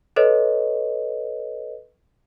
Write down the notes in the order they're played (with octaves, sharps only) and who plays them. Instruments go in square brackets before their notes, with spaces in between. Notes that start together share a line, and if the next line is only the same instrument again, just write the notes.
[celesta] A4 B4 C#5 D#5